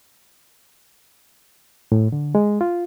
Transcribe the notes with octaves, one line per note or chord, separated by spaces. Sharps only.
A2
D3
G#3
F4